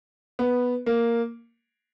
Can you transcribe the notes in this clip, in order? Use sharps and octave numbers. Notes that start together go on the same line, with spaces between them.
B3
A#3